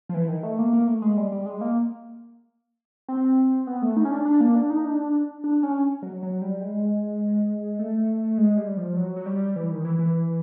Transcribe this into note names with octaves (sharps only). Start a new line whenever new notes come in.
F3
E3
D#3
A3
A#3
A#3
A3
G#3
G3
G3
G#3
A#3
C4
B3
A3
D#4
C#4
D4
D4
A#3
D4
D#4
D4
D4
C#4
F#3
F#3
G3
G#3
A3
G#3
G3
F3
F#3
F#3
G3
E3
D#3
E3
E3